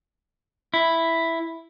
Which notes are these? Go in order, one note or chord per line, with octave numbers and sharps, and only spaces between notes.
E4